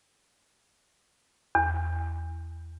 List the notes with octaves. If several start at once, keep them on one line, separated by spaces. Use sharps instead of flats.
E2